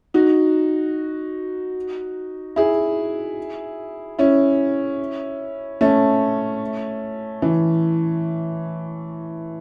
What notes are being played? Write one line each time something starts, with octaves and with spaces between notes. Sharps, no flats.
D#4 F#4
E4 G#4
C#4 E4
A3 C#4
E3